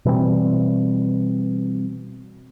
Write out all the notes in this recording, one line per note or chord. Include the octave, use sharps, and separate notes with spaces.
B2 E3 G3 C4